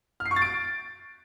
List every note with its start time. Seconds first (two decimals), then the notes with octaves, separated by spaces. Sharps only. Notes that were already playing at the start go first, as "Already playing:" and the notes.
0.20 F6
0.26 C7
0.31 C#6
0.36 A6
0.42 D7